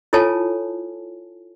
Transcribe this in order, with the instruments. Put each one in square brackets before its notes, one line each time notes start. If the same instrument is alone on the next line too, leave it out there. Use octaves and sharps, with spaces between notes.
[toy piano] E4 F4 A4 C#5 G#5 A5